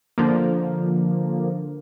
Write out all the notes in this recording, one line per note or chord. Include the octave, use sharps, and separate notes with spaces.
D3 F3 A#3